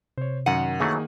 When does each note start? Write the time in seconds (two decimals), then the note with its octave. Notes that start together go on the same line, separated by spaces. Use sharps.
0.18 C3 C5 C#5
0.46 F#2 D#3 F#5 D#7
0.80 D#3 E3 F#3 A3 A#3 G#4